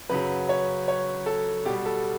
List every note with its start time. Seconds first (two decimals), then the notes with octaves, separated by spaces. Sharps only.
0.09 F#2 C#3 F#3 B4
0.49 C#5
0.88 C#5
1.26 A4
1.66 B2 G3 G4
1.86 A4